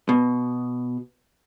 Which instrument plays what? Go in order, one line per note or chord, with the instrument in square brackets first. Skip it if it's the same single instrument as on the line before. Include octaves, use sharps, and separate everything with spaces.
[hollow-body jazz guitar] B2